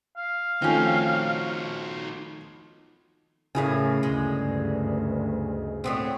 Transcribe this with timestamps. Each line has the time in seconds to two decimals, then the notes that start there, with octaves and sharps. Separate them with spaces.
0.17 F5
0.62 D#3 F3 A3 C4 C#4 D#4 F#4
3.55 A2 C#3 E4 G#4 A#4 G#5
4.03 D2 G2 G#3
5.84 A2 B3 C4